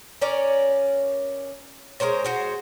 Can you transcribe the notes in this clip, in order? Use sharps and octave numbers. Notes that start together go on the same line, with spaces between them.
C#4 A#4 C#5 D5
G#3 A#4 C5 C#5
G#3 F#4 C5